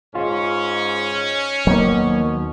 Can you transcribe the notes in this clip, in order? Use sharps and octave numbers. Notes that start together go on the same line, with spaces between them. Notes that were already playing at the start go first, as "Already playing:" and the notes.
G#2 C#4 F4
D#2 B2 D#3 F#3 A#3 C5